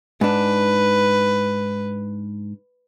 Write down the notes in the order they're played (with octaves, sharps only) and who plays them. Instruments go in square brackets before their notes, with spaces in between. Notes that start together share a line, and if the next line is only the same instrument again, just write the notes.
[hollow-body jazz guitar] G#2 D4 [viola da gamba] B4